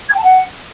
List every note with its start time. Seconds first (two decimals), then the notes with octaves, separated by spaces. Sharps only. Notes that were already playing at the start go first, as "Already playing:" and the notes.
0.07 G#6
0.13 G5
0.18 A5
0.23 F#5